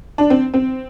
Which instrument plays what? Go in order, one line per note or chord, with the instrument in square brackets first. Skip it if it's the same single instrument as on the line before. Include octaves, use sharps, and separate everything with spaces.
[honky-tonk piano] D4
C4
C4